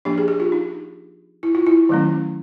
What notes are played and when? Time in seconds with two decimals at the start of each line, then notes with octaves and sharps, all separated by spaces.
0.05 F3 A#3 D4 G4
0.18 G#4
0.28 G4
0.40 F4
0.52 D#4
1.43 E4
1.55 F4
1.67 E4
1.89 D#3 F#3 A3 C#4